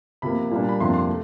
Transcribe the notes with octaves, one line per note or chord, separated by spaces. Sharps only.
C3 F3 A#3 B5
A#2 G3 A#3 D4
B5
F2 C3 F3 A#3 D4 C6
C6
A3